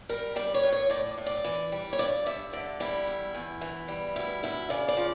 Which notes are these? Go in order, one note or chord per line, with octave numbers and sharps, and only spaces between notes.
G3 A#4
G3 D5
C#5
A2
C#5
A2 D5
A2
D5
E3
G3
C#5
G2 D5
G2 E5
D3 D5
G3 E4
E2
E2
E3
G3
D2 E4
D2 E4
C#3 D5
D5
F3